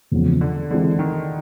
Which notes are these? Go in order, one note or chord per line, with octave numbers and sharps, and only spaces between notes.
E2 C#3 F3 G#3 B3
D3
D3 E3 G#3 C4 E4
D#3